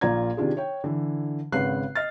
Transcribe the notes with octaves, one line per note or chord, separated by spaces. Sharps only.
A#1 A#2 F4 D5 A#5 G#6
C3 D#3 D4 F4 G#4
C#5 G5
D3 E3
G#1 C#3 B4 F#5 F#6 C7
D#5 F6 A6